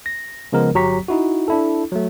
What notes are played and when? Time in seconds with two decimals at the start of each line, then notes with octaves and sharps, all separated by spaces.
0.06 A#6
0.52 C#3 F3 G#3 B3 A#4
0.75 G1 F#3 G4 A#5 C#6 B6
1.08 D#4 E4 F#4
1.48 D4 E4 A4
1.92 F#3 A3